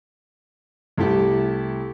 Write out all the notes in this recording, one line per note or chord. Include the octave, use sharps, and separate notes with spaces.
C2 A3 E4 G4